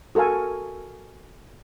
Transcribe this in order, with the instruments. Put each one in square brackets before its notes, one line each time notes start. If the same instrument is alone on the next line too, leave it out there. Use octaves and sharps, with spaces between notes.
[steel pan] F#4 A4 A#4 F5 G#5